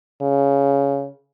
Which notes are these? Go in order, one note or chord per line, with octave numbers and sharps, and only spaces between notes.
C#3